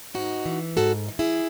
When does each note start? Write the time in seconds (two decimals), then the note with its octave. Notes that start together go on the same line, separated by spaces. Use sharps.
0.14 G#2 D#4 F#4
0.46 E3
0.77 G#2 F#4 A4
1.09 E3
1.19 E4 G#4